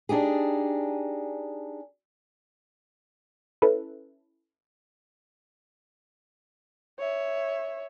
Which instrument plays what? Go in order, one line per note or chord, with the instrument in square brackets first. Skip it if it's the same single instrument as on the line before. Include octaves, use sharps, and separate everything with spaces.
[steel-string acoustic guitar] D4 D#4 G4 G#4
[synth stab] C#4 E4 A4 B4
[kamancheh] C#5 E5